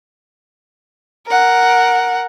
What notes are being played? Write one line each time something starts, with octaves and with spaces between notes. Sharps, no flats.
A#4 F#5